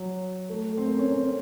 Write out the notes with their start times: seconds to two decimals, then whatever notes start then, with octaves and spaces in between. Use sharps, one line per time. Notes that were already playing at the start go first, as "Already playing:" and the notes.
Already playing: F#3
0.50 A3
0.77 C4
0.86 A#3
0.99 C#4
1.11 C#4
1.23 C#4